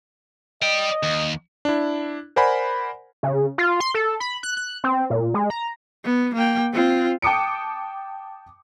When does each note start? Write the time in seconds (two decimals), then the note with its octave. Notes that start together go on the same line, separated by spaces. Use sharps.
0.62 D5 D#5 G5
1.03 D#2
1.65 D4 E4
2.36 A#4 C5 D5 F#5 G#5 B5
3.23 C#3
3.58 F4
3.80 C6
3.94 A4
4.20 B5
4.43 F#6
4.57 F#6
4.84 C4
5.10 A#2
5.34 G#3
5.50 A#5
6.05 B3
6.34 A#3 G5
6.73 C4 F4
7.22 G5 A5 D6 D#6 C#7 D7